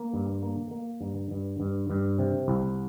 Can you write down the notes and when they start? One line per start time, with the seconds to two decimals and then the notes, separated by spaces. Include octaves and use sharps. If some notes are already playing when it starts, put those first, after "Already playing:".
Already playing: A#3
0.13 G2
0.43 A#3
0.71 A#3
1.01 G2
1.31 G2
1.60 G2
1.90 G2
2.18 C3
2.48 C2